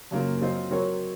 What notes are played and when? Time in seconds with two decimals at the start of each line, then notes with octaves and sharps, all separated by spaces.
0.11 F#2 C#3 F#3 A#3 F4
0.41 F#3 C4 F4 C5 D#5
0.71 F#3 C4 F#4 A#4 C#5